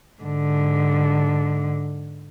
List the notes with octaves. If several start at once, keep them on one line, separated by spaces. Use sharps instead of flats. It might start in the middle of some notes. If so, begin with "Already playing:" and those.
G#2 D3